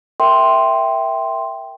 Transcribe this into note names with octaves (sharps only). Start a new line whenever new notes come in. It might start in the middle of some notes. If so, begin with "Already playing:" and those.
A#4 E5 G5 C6